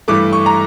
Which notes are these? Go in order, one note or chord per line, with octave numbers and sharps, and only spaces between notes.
G2 E3 A3 D6
C#6
A#5